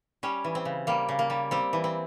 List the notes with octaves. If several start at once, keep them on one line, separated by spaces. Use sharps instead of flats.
G3 C#4
E3
C4
C#3
G3 A#3
C#3
A#3
G3
G3 C4
E3
C4